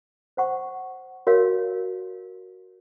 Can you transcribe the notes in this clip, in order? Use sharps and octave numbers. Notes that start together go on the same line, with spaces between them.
C5 F#5 C#6
F#4 A#4 C#5 F5